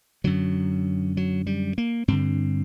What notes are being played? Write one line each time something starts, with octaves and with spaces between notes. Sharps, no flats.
F#2 D3 F#3
F#3
G3
A#3
G2 D3 C4